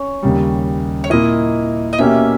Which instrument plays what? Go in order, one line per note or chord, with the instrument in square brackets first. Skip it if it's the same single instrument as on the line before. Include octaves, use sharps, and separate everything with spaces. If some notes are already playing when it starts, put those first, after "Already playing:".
Already playing: [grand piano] C#4 [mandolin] C#5
[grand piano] D#2 C#3 G3
[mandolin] C#5
[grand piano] A#2 A#3 E4 [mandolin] D#5
[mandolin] D#5
[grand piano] B2 A#3 C#4 G4 [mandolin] E5